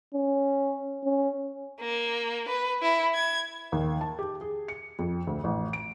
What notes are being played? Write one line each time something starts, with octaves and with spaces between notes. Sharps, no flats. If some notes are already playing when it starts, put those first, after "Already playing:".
C#4
C#4
A#3
B4
E4
G#6
D#2
A5
G4
G#4
C#7
F2
D2
A1
D7